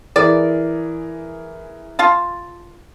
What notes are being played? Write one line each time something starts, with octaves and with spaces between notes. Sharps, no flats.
E3 G#4 A#4 D5
F4 F5 A5